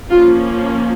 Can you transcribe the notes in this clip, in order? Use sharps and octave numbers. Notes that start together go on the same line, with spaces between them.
F3 A#3 C#4 F4